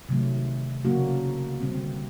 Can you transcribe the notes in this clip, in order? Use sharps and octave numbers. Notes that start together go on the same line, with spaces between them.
C3 D#3 F#3 A3
C#3 F#3 A#3 D4 F#4
D3 G3 C4